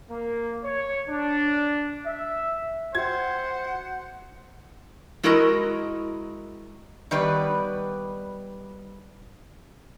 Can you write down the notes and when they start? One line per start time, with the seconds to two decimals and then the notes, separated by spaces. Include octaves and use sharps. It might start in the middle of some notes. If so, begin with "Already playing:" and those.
0.11 A#3
0.64 C#5
1.09 D4
2.06 E5
2.95 F#4 C5 E5 F#5 G5 G#6
5.23 G#3 E4 F#4 A#4 D#5 A#5
7.11 D#3 G3 B3 B4 D5